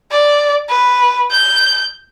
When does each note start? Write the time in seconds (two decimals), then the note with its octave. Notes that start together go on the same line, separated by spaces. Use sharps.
0.11 D5
0.69 B4
1.31 G6